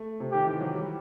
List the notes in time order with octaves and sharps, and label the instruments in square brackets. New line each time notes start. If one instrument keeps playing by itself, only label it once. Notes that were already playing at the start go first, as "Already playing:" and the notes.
Already playing: [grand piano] A3
C3
[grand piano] D#3 [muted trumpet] G4
[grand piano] E3
F#3
G3